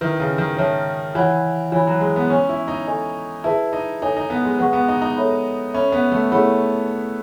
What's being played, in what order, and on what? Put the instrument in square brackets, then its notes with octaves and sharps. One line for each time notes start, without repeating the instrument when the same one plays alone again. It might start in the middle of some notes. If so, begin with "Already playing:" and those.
[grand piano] D#3 [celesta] E4 B4 E5
[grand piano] C#3
D#3
[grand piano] D#3 [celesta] C#5 E5 A5
[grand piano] E3 [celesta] C#5 F#5 B5
[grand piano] E3 [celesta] C#5 G#5 B5
[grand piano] F#3
G#3
B3
[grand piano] C#4 [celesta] C#5 G#5 C#6
[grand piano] E4
D#4
[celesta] A4 D#5 G#5 C#6
[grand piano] E4 [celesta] G#4 B4 E5 A5
[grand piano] D#4
[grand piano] D#4 [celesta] A4 C#5 G#5
[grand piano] D#4
B3
G#3
[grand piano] G#3 [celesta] B4 F#5 C#6
[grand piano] B3
D#4
D#4
[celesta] A4 C#5 E5 B5
[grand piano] C#4 [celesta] A4 E5 B5
[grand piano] B3
A3
[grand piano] A3 [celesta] E4 G#4 C#5 F#5 B5